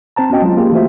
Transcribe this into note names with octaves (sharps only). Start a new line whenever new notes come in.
C4 C5 A5 A#5
B3 C#4 F#4 D#5 G5
F#3 G#3 F4
A#3 F4 G4 G#4
E3 A3 A#3 F#4 C5 E5